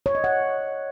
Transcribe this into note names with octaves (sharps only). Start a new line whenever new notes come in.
C#5
D#5
F#5